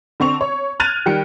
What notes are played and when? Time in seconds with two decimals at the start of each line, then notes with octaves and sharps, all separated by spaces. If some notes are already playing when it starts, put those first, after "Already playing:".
0.20 D3 C4 C#6 F7
0.41 C#5
0.80 F6 F#6 G#6 A6 D#7 F7
1.06 D#3 G3 G5 C#7